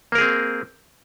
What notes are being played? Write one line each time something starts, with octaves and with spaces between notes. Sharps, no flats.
A#3 C4 G#4 A#4